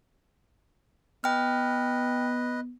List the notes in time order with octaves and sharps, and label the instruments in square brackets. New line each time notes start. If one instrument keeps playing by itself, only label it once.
[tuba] B3 [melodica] B4 D#5 [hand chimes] G5 F6